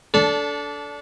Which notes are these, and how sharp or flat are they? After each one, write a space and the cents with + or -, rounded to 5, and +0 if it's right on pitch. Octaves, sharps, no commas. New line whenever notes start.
D4 -20 A4 +0